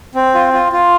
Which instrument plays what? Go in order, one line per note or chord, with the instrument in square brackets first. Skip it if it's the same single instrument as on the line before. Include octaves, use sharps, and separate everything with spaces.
[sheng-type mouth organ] C4
F4
F4
F4